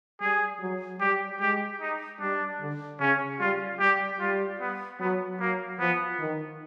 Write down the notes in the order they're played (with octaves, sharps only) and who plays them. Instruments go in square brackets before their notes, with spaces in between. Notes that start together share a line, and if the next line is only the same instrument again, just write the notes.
[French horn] G3 [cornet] G#4
[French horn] F#3
[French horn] G3 [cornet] G4
[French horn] G#3 [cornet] G4
[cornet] D#4
[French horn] G3 [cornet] D4
[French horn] D3
[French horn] C#3 [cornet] C#4
[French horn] G3 [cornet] F4
[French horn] G3 [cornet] G4
[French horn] G3 [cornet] F4
[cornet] B3
[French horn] F#3 [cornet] B3
[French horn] F#3 [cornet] A#3
[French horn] F3 [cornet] B3
[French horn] D#3